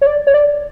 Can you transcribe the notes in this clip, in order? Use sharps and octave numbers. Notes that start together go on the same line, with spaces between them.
C#5
D5
C#5
D5